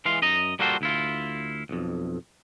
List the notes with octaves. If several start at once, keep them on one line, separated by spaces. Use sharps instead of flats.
E3 G#3 F5 C6
F#2 D#5 A#5
G3 A#3 F4 F#4 A4 C5
D2 E4 F4
B1 F2